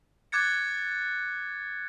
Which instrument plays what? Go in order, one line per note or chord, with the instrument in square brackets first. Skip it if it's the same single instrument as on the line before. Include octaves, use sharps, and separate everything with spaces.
[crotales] D6 F#6 G#6 A6 C#7